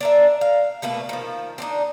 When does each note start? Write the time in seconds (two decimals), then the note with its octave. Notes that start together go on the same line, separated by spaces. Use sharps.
0.01 D4 A#4 E5
0.41 F5
0.82 B2 A3 A#3 B4
1.09 D#3 F3
1.58 C4 D4 D#4